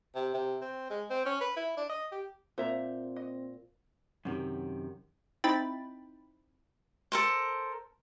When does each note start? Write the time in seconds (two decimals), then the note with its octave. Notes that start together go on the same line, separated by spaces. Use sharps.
0.15 C3
0.34 C3
0.62 C4
0.90 G#3
1.10 C4
1.25 C#4
1.41 B4
1.57 E4
1.77 D4
1.89 D#5
2.12 G4
2.58 A#2 C4 C5 E5 A#5
3.16 D#5
4.25 F#2 C3 D#3
5.44 C4 D#4 E4 G5 B5 A6
7.12 A4 A#4 C5